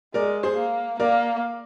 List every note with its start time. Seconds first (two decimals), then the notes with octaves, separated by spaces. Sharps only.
0.14 G#3 A#4 D5
0.43 G#4 C5
0.57 A#3
1.00 A#3 A#4 D5